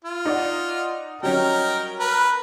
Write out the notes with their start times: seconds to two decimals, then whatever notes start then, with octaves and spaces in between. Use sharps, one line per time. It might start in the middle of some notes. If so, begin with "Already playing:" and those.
0.05 F4
0.25 D#4 D5 F#5
1.23 F#3 G3 C#4 D#4 A#4 G5
2.00 A#4 B4